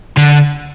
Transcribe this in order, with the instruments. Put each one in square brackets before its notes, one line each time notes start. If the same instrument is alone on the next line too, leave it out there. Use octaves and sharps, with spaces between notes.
[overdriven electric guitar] D3